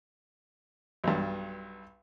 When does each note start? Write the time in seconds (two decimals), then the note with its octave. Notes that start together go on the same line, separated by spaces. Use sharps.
1.04 B1 G2